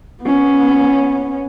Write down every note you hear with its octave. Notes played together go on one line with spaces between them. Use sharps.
B3 C#4